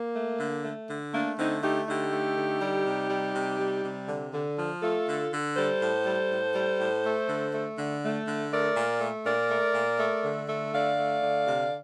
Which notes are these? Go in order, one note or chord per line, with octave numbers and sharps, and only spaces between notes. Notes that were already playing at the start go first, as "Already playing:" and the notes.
Already playing: A#3
A3
D3
A3
D3
A3 A#3 D4
D3 C4 D#4
A3 D#4 G4
D3 D#4 G4
A3
D3
G3
C3
G3
C3
G3
C3
D3
D3
F3
A3 F4 A4
D3
D3
G3 A4 C5
A2
G3
A2
G3
A2
A3
D3
A3
D3
A3
D3
A3 A#4 D5
A#2
A3
A#2 A#4 D5
A3
A#2
A3
D3
A3
D3 D5 F5
A3
D3
C3